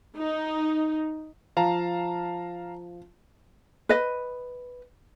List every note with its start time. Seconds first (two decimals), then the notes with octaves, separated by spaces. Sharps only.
0.16 D#4
1.57 F3 F5 A5 A#5
3.89 B4 D#5